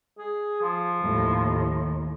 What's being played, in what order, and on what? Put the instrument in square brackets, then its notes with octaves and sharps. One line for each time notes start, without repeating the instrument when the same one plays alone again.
[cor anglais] G#4
F3
[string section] D#2 A2